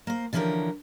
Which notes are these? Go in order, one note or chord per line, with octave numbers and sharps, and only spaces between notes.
A#3 C5
D3 E3 F3 C#4 G4 A#4